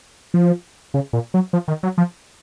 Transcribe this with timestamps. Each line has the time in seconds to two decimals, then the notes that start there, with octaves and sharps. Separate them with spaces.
0.34 F3
0.94 C#3
1.13 A#2
1.34 F#3
1.53 F3
1.68 D#3
1.83 F#3
1.98 F3